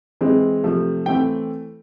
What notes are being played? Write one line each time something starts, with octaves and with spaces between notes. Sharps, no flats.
E3 G#3 C4
C3 F3 A3
E3 A3 C4 G5